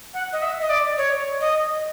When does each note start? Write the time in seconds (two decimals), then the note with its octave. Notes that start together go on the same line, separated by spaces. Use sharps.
0.14 F#5
0.33 D#5
0.42 E5
0.61 D#5
0.70 D5
0.98 C#5
1.41 D#5